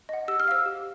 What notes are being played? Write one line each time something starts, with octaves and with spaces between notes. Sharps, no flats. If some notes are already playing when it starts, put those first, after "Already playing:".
D#5 F#5
G4 E6
F6
C5 F5 E6
G4